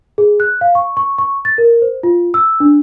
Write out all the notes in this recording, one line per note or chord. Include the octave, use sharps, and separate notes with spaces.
G#4
F#6
F5
C#6
C#6
C#6
A6
A#4
C5
F4
E6
D4